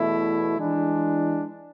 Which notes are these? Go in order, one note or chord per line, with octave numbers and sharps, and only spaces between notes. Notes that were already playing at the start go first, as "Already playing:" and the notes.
Already playing: E2 B2 A3 E4
E3 G#3 D4